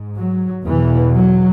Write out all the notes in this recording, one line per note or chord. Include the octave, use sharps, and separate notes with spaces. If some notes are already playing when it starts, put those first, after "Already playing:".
Already playing: G#2
F#3
E2 B2 E3
F#3